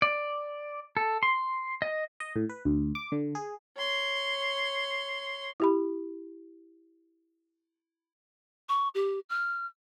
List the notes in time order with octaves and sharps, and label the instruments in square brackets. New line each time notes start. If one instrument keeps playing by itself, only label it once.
[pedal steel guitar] D5
A4
C6
D#5
[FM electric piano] D#5
A2
B4
D2
D6
D3
G#4
[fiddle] C#5 C6
[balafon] E4 G4 B5
[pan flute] C#6
G4
F6